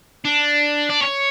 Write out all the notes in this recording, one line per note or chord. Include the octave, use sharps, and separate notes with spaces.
D4
D5
C#5